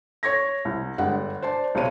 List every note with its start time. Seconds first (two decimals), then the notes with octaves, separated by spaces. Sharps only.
0.23 C#5 C#6 G#6 A#6
0.65 C2
0.98 G1 G3 G#3 F#5 F#6
1.42 C5 D5 A5
1.75 B1 C3 C#5 D#7